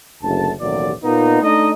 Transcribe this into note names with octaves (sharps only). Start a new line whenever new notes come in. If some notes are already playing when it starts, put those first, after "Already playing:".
F#1 D2 A5
A1 D#2 B2 E3 F#3 D5
A#2 A#3 B3 D#4
A3 D4 D#4 D#5